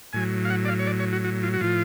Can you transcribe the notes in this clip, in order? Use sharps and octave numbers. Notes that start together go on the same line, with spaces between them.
A2 F#3 G#5
F5
F#5
D5
F5
C#5
D5
C#5
F#4
F#4
F4
F#4
A2 F3 F4